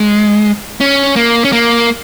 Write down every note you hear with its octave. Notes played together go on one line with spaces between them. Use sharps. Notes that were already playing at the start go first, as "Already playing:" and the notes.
Already playing: G#3
C#4
A#3
C#4
A#3